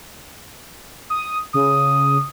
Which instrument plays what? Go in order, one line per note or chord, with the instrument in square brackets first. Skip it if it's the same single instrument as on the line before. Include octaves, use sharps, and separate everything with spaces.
[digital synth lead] D#6
[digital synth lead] C#3 [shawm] D#6